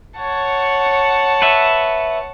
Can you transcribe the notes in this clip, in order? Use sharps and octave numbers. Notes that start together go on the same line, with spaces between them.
C#5 F#5 A5
B4 E5